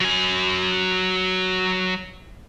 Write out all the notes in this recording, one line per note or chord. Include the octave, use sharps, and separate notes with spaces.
F#3 G#5